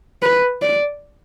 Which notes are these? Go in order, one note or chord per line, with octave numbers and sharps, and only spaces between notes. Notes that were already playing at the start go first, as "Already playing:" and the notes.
B4
D5